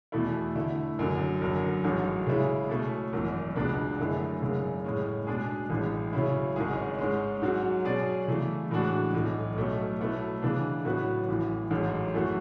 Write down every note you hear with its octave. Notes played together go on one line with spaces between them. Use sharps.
E2 B2 A3 E4
D3 A3 E4
F#1 F#2 D3 F#3
F#1 F#2 D3 F#3
A1 G#2 F#3 C#4
C#3 G#3 C#4 E4
B2 A3 C#4
G#1 F#2 E3
C#2 B2 G#3 B3 D4
F#2 D3 A3 E4 G#4
G#1 F#2 C#3 G#3
A2 G#3 C#4
B2 G#3 D4 G#4
A1 A2 G#3
C#3 F#3 C#4 E4
G#1 G#2 G#3 C#4 G#4
G#2 G#3 C#4
G#2 F#3 C#4 F#4
B2 F#3 C#4 G#4 D5
C#3 E3 A3
A2 E3 G#3 D4 F#4
B1 A2 E3
B1 B2 F#3 A3 C#4
B2 F#3 A3 E4 B4
C#3 E3 B3 D4
A2 F#3 B3 F#4 B4
A1 A2 E3
A1 G#2 F#3 C#4
F#2 E3 A3 C#4 F#4